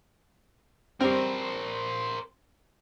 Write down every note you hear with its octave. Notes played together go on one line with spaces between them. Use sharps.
G3 C4 A#4 C5